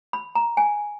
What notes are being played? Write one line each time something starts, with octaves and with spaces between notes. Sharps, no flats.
B5
A#5
G#5